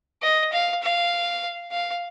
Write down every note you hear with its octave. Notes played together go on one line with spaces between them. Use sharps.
D#5
F5
F5
F5